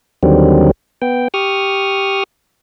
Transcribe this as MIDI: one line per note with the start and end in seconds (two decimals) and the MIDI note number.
0.23 0.71 39
0.23 0.71 50
0.23 0.71 51
0.23 0.71 54
0.23 0.71 55
0.23 0.71 60
1.02 1.28 59
1.02 1.28 79
1.34 2.23 67
1.34 2.23 85
1.34 2.23 87
1.34 2.23 89